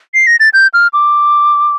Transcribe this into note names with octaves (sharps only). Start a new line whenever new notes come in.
C7
A#6
A6
G6
F6
D6